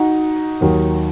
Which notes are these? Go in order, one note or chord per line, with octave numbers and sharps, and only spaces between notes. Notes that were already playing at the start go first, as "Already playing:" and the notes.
Already playing: D#4 F#4
D#2 D#3 F#3